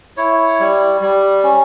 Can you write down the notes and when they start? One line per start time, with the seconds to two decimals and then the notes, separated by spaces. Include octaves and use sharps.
0.17 E4 C#5
0.60 G3
1.01 G3
1.44 C#4